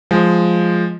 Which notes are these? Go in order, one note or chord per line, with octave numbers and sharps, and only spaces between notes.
F3 G#3